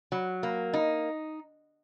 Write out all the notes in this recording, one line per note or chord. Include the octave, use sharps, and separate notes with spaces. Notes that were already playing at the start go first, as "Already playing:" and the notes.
F#3
A#3
D#4